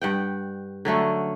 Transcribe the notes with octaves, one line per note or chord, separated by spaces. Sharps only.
G2 F#5 G5
D3 F#3 A3 C#4